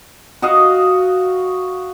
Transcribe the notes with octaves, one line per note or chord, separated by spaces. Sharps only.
F#4 D#5 F5